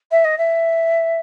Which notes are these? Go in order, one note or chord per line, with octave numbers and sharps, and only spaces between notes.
E5
D#5
E5